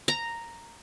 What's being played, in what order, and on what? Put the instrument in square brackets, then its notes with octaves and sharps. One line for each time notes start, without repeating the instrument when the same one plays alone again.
[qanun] A#5